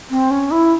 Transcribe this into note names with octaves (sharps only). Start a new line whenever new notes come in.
C4
C#4
E4